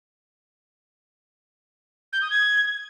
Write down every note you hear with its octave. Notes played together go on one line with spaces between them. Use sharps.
G6
D#6
G#6